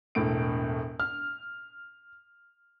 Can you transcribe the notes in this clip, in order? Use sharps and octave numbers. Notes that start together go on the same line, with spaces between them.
E1 A2 D7
F6